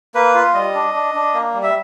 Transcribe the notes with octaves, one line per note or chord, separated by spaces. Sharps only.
A#3 B4
F4
G3 D#5
D4
D4
D4
A#3
G3
E5